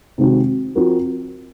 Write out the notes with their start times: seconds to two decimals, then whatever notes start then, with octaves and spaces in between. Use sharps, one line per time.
0.18 C3 D#3 G#3 C4 F#4
0.75 F3 C4 F#4 A#4